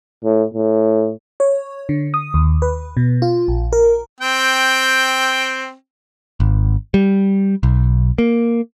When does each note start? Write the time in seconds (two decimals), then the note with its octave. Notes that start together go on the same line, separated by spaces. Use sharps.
0.24 A2
0.54 A2
1.40 C#5
1.89 D3
2.14 D#6
2.34 D#2
2.62 B4
2.97 B2
3.22 F4
3.48 A#1
3.73 A#4
4.20 C4 G5
6.40 G#1
6.94 G3
7.63 B1
8.18 A#3